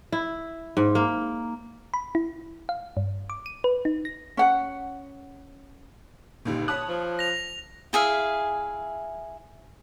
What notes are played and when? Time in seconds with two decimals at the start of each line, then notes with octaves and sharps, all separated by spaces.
0.12 E4
0.77 G#2
0.95 A#3
1.94 B5
2.15 E4
2.69 F5
2.97 G2
3.30 D6
3.46 D#7
3.64 B4
3.85 D#4
4.05 A#6
4.37 C#4 F#5
6.45 G1 C#2 A#2 D3 D#4 G4
6.68 C#5 A5 B5 D#6 F#6
6.89 F3
7.19 A#6 F7
7.93 E4 G#4 E5 F5